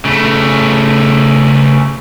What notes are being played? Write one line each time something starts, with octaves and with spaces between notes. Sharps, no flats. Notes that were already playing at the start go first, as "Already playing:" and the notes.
C#3 A3